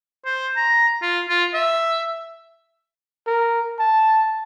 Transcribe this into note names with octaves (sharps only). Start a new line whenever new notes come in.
C5
A#5
F4
F4
E5
A#4
A5